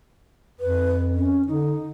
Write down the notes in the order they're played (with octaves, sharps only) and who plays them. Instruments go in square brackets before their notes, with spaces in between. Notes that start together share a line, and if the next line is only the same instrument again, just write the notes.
[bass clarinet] F2 [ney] B4
[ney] C#4
[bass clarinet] D3 [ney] D#4